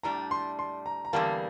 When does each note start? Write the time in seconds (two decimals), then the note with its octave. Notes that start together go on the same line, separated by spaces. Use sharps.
0.03 A2 G3 D4 A#5
0.31 C6
0.59 C6
0.86 A#5
1.05 A#5
1.13 E2 D3 G3 A#3 A5